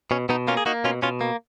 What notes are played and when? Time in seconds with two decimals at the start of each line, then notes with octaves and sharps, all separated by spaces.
0.11 B2 C#4
0.29 B2 B3 D#4
0.48 A#3 C#4 F4
0.57 G#4
0.66 A#3 D#4 F#4
0.84 B2 C#4 F4
1.02 B2 C#4 F4
1.21 A#3